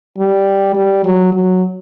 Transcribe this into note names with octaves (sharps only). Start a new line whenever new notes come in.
G3
G3
F#3
F#3